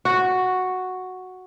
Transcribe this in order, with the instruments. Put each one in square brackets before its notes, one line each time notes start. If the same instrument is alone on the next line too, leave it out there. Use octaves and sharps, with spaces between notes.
[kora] F#4